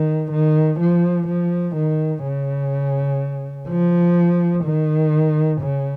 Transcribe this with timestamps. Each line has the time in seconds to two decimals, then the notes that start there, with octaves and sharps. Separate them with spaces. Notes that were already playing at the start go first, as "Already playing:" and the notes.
Already playing: D#3
0.32 D#3
0.80 F3
1.28 F3
1.76 D#3
2.24 C#3
3.69 F3
4.64 D#3
5.61 C#3